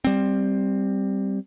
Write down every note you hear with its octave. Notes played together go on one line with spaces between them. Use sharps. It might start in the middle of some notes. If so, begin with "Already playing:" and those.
G3 C4